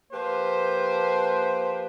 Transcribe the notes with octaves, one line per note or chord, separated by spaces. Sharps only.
F3 A#3 G4 B4 C5